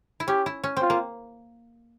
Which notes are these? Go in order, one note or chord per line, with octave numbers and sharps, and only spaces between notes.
E4
C#4 G4
E4
C#4
C4
F4
A#3